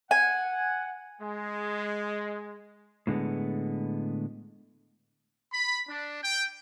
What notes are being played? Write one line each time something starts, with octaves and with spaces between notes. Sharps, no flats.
F#5 G#5
G#3
A2 D3 G#3 B3
B5
D4
G5